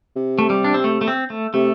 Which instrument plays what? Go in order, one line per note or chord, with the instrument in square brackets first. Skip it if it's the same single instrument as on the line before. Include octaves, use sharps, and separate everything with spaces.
[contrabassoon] C3
[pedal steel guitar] A3
G3
D4
C4
A3
A3
C4
A3
[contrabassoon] C3 [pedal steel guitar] A3